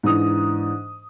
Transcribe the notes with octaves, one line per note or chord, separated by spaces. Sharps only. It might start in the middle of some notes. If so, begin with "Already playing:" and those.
G#2 E3 D4 D#6